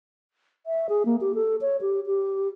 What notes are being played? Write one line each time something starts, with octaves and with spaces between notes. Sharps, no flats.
E5
G#4
A#3
G4
A4
C#5
G4
G4